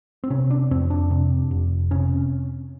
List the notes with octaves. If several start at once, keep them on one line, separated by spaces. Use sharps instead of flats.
C4
C3 C#4
D4
F2 C4
D4
C3
F1
C3 C#4